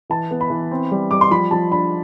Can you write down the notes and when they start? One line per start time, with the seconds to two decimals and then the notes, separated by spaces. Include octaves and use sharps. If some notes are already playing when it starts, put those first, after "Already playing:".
0.10 E3 A5
0.31 B3
0.41 B5
0.50 E3
0.71 C4
0.91 G3
1.11 G3 D6
1.21 C6
1.31 F3 B5
1.51 F3 A5
1.71 D4 B5